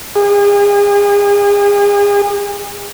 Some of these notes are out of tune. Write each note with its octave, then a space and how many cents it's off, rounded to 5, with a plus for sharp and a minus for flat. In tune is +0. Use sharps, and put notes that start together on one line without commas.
G#4 -40